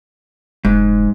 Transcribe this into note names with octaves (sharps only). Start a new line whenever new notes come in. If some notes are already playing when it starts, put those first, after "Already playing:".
F1 G#2